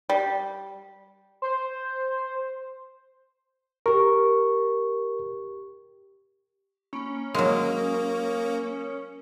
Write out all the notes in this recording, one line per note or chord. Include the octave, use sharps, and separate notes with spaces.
G3
C5
G4 A#4 C#6
A#3 C#4 B5
F#3 G#3 A#3 A#4 D#6